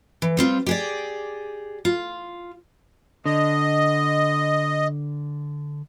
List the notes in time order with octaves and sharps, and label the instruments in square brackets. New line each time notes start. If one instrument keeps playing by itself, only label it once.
[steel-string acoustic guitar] E3
G3 C4 F4
G4 G#4 D5
F4
[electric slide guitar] D3 [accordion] D#5